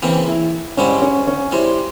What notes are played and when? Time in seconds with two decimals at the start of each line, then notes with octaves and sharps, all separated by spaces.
0.02 C#3 E3 A#3 C4
0.27 E4
0.77 G#2 G3 C4 C#4 E4
1.02 C#4
1.27 C#4
1.52 C3 G3 C4 E4